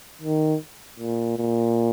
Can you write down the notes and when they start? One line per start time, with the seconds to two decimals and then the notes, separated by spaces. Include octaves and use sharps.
0.22 D#3
1.00 A#2
1.38 A#2